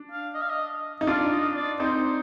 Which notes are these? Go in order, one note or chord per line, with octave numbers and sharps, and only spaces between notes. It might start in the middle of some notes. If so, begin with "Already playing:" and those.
Already playing: D4
F5
D#5
F5
D#5
D#4
D4 F4 F5
D#5
D5
C4 D#4 C5